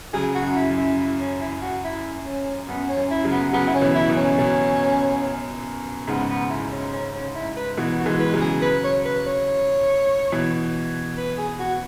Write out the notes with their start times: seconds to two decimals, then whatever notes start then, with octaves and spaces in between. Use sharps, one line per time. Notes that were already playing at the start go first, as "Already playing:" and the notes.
0.14 C#3 F#3 G#4
0.35 F#4
0.42 F#2
0.56 E4
0.70 F#2
0.78 E4
0.98 E4
1.20 C#4
1.41 E4
1.62 F#4
1.84 E4
2.26 C#4
2.68 F#2 B3
2.89 C#4
2.97 F#2
3.11 E4
3.25 C#3 F#3
3.32 B3
3.53 C#3 F#3 B3
3.68 E4
3.74 C#4
3.81 B2 E3
3.95 E4
4.10 F#2 B2
4.17 C#4
4.38 F#2 B2
6.07 G#2 C#3 B3
6.29 B3
6.50 E4
6.72 C#4
6.93 C#4
7.14 C#4
7.35 E4
7.57 B4
7.77 B2 E3 F#4
7.99 F#4
8.06 E3 G#3
8.20 B4
8.34 C#3 F#3
8.41 G#4
8.62 B4
8.84 C#5
9.05 B4
9.27 C#5
10.32 B2 E3
11.17 B4
11.38 G#4
11.59 F#4